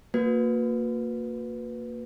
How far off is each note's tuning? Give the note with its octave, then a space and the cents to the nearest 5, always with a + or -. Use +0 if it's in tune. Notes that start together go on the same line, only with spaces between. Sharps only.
A#3 -15 F#4 -45 B4 +0